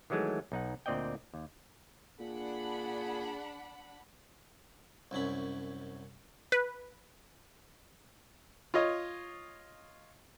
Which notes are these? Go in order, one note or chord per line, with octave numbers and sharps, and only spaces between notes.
D#3 E3 F#3 G#3 A3
B1 D#4 F#5
D2 A#2 C4 D5 D#5 G5
D#2
A#2 D4 G#4 F#5 B5
C2 F#2 C#4 B5
B4
F4 C#5 D#5 D#6